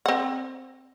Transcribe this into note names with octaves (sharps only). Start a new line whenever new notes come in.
C4 F#5